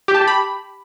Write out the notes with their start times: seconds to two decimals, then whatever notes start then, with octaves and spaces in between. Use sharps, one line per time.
0.08 G4
0.15 A5
0.21 G4
0.28 B5